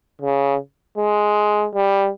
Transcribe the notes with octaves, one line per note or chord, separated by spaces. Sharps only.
C#3
G#3
G3